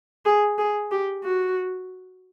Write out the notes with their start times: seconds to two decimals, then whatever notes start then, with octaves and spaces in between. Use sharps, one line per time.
0.25 G#4
0.58 G#4
0.91 G4
1.24 F#4